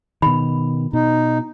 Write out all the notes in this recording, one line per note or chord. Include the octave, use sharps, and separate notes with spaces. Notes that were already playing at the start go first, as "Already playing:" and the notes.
B2 D#3 B5
B2 D#4